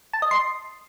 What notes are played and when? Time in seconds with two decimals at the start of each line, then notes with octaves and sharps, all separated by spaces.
0.13 A5
0.22 D#5
0.31 C6